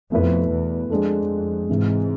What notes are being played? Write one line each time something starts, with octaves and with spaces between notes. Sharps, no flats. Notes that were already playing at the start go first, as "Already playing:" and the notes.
F2 B2 A3 E4 B4
E2
F2 G#3 D4 A4
G#2 C3 E3 G#3